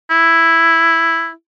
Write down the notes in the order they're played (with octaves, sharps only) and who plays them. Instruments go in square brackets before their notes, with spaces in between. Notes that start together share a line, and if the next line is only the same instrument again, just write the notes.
[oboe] E4